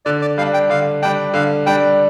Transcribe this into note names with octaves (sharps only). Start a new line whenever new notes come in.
D3 D5
D5
G3 D4 F5
G5
D3 F5
G3 D4 G5
D3 F5
G3 D4 G5